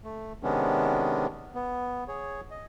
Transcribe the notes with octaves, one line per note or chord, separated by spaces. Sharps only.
A3
C3 D#3 G#3 B3 C#4 D4
B3
G#4 C#5
D#5